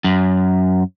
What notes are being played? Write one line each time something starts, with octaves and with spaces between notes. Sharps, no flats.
F#2